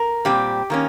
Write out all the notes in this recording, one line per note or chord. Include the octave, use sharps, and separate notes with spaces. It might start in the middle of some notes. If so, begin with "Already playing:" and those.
Already playing: A#4
A#2 G3 C4 G4
D#3 A#3 C#4